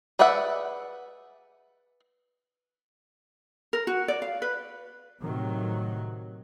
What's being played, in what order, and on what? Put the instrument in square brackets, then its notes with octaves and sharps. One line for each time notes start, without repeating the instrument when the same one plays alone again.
[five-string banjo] G#4 B4 D5 E5 F#5
[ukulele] A#4
F#4
D5
F5
B4
[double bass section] A2 C3 D#3 F#3